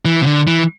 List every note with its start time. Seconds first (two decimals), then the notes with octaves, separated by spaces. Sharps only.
0.05 E3
0.22 C3
0.26 D3
0.47 E3